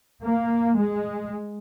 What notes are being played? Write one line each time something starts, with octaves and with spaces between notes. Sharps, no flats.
A#3
G#3